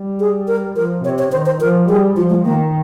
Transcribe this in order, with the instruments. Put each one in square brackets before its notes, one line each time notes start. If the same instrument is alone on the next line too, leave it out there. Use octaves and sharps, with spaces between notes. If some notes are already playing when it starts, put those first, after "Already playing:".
Already playing: [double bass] G3
[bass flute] G#4
A#4
[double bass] F3 [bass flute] A#4
[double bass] C3 [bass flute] C#5
[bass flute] C#5
[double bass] D#3 [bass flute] C5
[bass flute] C5
[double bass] F3 [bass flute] A#4
[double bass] G3 [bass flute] G#4
[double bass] F3 [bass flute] F4
[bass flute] G#3
[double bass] D#3 [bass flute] A#3